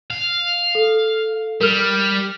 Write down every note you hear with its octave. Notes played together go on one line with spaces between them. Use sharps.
F5
A4
G3 A#4 F6